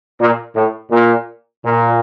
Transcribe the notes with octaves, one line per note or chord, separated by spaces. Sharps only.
A#2
A2
A#2
A#2